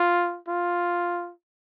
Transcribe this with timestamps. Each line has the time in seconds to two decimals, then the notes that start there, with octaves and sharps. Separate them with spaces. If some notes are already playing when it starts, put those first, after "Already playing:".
Already playing: F4
0.48 F4